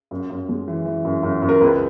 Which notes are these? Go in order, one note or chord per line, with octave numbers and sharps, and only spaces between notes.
F#2
F#2
G#3
E3
E3
F#2
F#2
F#2
A#4
C#2 B4